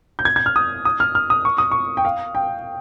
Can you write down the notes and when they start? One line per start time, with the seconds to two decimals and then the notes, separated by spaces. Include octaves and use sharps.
0.19 G6
0.25 G#6
0.36 G#6
0.46 F6
0.56 D#6
0.85 D#6
1.00 F6
1.15 F6
1.30 D#6
1.45 C#6
1.58 D#6
1.72 C#6
1.97 G5
2.05 F5
2.35 G5